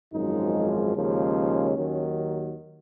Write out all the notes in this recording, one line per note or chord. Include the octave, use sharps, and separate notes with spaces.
G#1 F#2 F3 G#3 D#4
D#2 C#3 F3 G#3 C#4
D#2 D#3 F#3